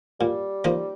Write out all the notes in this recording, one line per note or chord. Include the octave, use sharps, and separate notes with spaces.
A#2 G3
F3 A#3 D#4